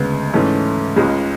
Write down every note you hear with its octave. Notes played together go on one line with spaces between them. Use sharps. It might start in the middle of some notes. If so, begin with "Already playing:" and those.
Already playing: D2 C#3 G#3 B3
G#2 E3 A3 C#4
C#2 C#3 G#3